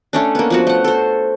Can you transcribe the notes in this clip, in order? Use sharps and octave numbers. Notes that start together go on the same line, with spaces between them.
A3 C#4 D4
A#3 B3
F3 B3 F#4
A3 F#5
A4 C5